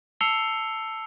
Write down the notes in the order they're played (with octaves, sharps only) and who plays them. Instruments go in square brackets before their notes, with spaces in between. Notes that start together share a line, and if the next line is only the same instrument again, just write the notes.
[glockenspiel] A5 E6 C7 C#7 F7 G7